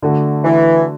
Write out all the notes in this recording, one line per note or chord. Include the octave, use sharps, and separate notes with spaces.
D3 A3 F#4
E3